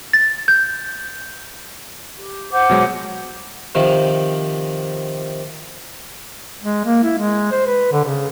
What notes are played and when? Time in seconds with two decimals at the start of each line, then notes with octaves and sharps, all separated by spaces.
0.13 A6
0.48 G6
2.17 G4
2.52 C5 F#5 D6
2.70 B2 F#3 G#3
3.75 C3 D#3 F3
6.63 G#3
6.85 A#3
7.03 E4
7.18 G#3
7.52 C5
7.66 B4
7.92 D3
8.04 C#3